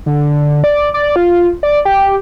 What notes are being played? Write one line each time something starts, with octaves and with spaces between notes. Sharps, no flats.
D3
D5
D5
F4
D5
G4